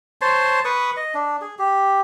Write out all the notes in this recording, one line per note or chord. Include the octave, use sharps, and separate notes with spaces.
C5 C#5 A5 C6
B4 C#6 D#6
D#5
D4
G#4
G4